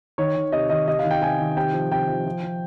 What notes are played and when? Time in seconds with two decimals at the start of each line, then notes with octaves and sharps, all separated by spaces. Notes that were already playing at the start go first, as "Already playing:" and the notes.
0.18 D#3 C#5
0.36 D#3
0.52 C3 D#5
0.70 D#3 D#5
0.88 C3 D#5
0.99 F5
1.04 D#3
1.11 G5
1.22 C3 G#5
1.39 D#3
1.57 C3 G5
1.73 F3
1.92 C3 G5
2.09 F3
2.26 F3
2.43 F3